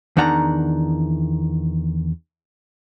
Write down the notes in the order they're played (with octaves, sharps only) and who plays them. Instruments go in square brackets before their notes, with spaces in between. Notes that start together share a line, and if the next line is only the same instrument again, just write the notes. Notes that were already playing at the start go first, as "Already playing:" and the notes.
[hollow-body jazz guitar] E2 D#3 D4 F#5 A#5